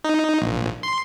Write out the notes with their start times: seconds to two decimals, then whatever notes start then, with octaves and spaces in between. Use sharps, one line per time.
0.04 D#4
0.42 A#1
0.83 C6